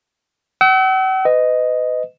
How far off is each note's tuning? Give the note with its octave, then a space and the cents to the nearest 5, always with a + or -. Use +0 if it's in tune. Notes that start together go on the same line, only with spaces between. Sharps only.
F#5 +45 E6 -30
B4 +35 D#5 +0